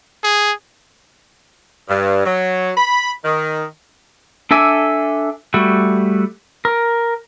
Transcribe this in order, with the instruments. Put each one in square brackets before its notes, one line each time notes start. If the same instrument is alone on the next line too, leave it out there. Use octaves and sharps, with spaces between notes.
[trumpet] G#4
[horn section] G2
F#3
B5
D#3
[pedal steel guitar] D4 A4 E5 G#5 D6
G3 A3 F#4
A#4